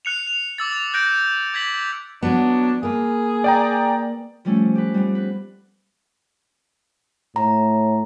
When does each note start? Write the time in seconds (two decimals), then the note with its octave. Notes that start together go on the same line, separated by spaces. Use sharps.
0.05 F#6 C#7 F7
0.27 F7
0.58 D6 E6 A6
0.73 F7
0.94 F#6 G6 A#6 D7
1.54 D6 G#6 A#6 B6 F#7
2.23 F#3 B3 D4
2.83 A#3 G#4 B4
3.44 D5 G5 A#5
4.45 F3 G3 A3 C#4
4.75 G4 B4
4.94 G3 B3 C4
5.15 B4
7.36 A2 A#5